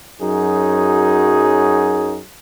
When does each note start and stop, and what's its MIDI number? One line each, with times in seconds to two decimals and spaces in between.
0.21 2.19 42
0.21 2.19 54
0.21 2.19 63
0.21 2.19 68